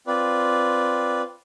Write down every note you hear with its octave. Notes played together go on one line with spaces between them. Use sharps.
C4 F4 B4 D5